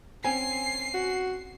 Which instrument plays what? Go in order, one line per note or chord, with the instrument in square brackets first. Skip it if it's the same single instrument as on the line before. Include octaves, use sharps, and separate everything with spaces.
[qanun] C4 C#4 [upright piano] G#5 [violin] C7
[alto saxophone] F#4